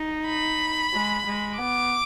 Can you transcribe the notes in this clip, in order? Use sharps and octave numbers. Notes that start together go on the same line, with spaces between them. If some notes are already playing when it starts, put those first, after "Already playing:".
Already playing: D#4
B5
G#3
G#3
B3 D6